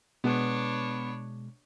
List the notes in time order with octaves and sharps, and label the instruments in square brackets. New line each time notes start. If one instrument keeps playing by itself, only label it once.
[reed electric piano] B2 G#3 [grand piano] B3 [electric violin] D4 C#5